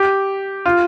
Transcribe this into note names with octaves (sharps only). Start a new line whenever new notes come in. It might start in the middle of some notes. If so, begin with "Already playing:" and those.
Already playing: G4
F4